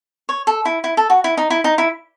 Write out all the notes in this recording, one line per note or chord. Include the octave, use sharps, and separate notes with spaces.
C#5
A4
E4
E4
A4
F#4
E4
D#4
E4
D#4
E4